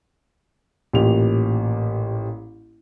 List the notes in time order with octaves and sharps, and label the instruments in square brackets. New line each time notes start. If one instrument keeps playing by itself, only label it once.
[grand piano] A1 A#2 A#3 G4 F7